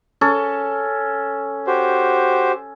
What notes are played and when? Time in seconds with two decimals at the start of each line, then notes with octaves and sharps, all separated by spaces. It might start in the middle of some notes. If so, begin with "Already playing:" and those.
0.21 C#4 A4
1.67 F#4 G4 C5